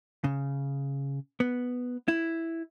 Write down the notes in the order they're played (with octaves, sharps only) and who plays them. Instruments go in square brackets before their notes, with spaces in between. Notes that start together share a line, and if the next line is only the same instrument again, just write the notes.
[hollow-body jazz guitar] C#3
B3
E4